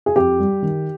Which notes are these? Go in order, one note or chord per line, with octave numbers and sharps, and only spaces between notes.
G#4
F2 G4
G3
D#3